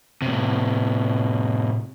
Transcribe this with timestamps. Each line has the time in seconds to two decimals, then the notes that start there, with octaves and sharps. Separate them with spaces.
0.22 A2 C3